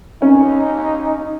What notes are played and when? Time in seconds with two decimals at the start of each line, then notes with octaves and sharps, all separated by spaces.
0.22 C#4 D#4